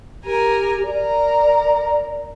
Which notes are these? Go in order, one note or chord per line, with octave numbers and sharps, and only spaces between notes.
G4 A#4 G#5
A#4 D5